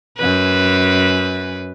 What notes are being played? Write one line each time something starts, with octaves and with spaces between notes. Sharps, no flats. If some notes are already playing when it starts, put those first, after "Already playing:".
F#2 B4